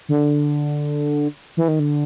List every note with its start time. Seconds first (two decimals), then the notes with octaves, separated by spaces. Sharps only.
0.09 D3
1.57 E3
1.68 D#3
1.79 D3